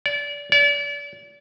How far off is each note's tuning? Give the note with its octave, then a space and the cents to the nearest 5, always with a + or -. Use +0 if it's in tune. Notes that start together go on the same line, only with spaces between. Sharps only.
D5 -30
D5 -40